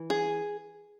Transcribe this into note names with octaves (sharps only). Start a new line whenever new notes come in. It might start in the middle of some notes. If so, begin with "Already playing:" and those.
Already playing: E3
G#4